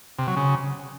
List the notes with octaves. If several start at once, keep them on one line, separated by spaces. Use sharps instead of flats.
C3
F#3
C#3